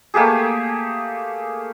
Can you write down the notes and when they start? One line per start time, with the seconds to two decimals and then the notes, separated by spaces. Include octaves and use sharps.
0.14 A3 A#3 G4 G#4